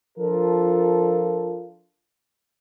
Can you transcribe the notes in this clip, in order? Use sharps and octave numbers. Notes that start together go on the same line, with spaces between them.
F3 D4 F4 A4 A#4